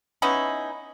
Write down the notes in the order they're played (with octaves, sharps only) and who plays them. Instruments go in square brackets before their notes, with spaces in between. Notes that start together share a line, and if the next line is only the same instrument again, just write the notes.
[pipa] B3 C#4 D#4 E4